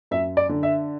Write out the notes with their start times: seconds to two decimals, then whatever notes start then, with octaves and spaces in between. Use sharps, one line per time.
0.11 F#2 E5
0.37 D5
0.49 D3
0.63 E5